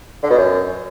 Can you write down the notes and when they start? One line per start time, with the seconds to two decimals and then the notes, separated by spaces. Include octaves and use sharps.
0.23 D3
0.30 B2
0.38 F#2